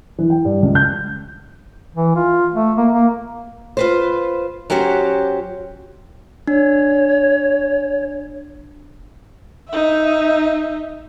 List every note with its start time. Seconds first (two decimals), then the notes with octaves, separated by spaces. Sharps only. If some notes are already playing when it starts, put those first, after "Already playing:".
0.19 E3
0.30 G5
0.45 G2
0.63 C#2
0.75 G6
1.95 E3
2.15 F4
2.54 A3
2.77 A#3
2.92 A#3
3.77 F4 B4 C5
4.70 F#3 C#4 F#4 G4 C5
6.48 D4 C#5
9.69 D#4 E5